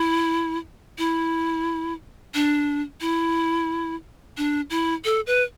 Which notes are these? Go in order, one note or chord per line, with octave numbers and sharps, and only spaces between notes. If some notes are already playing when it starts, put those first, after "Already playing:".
Already playing: E4
E4
D4
E4
D4
E4
A4
B4